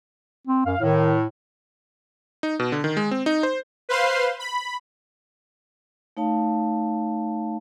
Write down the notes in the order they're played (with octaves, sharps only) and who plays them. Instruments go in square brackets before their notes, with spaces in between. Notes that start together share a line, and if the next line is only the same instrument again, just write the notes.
[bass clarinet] C4
[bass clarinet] F#2 [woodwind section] F5
[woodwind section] A2 [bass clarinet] D#3
[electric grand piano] D#4
B2
D3
D#3
G#3
C4
D#4
C5
[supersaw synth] B4 C5 F5 C6
B5
[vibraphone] A3 D#4 C#5 F5 A5